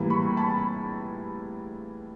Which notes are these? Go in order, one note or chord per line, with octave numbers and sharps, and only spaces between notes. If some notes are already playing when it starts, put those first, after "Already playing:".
Already playing: A2 E3 G3 A#3
B5 C#6
A5 B5